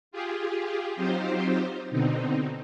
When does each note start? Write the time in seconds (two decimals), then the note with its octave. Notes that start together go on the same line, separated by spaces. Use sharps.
0.11 F4 G4 G#4
0.96 F#3 C4 D#4 F4 G4 C5
1.91 B2 D3 C4 D#4